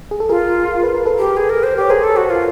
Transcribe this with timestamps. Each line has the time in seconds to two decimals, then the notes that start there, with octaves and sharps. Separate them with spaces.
0.11 G#4
0.20 A4
0.29 F4 G#4 A#4
0.83 B4
0.95 A#4
1.06 A4 B4
1.19 G4
1.37 G#4
1.50 A#4
1.63 C5
1.77 G4 C#5
1.90 G#4 A#4 C5
2.04 A4
2.17 F#4
2.30 F4